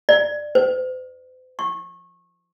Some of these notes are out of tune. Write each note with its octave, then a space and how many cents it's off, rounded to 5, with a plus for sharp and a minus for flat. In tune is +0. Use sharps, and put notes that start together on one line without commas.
D5 +20
C5 -45
C#6 -25